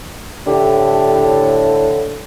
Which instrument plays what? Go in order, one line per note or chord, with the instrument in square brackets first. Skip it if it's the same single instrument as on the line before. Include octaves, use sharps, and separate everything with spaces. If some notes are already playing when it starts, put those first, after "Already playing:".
[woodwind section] A2 D3 [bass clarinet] G4